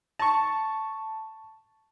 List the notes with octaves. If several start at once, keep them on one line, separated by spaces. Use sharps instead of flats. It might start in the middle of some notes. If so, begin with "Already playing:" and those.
A5 C#6